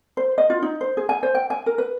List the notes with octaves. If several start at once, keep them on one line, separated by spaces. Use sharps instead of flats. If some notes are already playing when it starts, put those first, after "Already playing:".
C5
D#5
F4
D#4
C5
G#4
G#5
C5
G5
G#5
A#4
B4